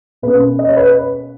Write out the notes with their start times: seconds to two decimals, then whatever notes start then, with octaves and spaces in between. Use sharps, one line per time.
0.22 B2 A#3 C#4 B4
0.59 D#5
0.69 C#5
0.77 B4